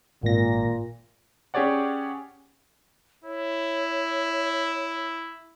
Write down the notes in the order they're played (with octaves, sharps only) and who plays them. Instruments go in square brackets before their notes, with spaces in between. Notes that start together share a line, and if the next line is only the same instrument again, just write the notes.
[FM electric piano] G#1 A#6 [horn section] A#2
[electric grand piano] C#4 G4 G#4 C#5 D5 F#5
[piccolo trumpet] E4 [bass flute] C#5